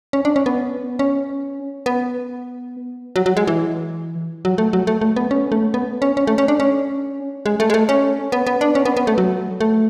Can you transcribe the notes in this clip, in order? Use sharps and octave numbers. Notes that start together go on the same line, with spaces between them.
C#4
D4
C#4
B3
C#4
B3
F#3
F#3
G#3
E3
F#3
A3
F#3
A3
A3
B3
C#4
A3
B3
C#4
C#4
A3
C#4
D4
C#4
G#3
A3
G#3
A3
C#4
B3
B3
D4
C#4
B3
B3
A3
F#3
A3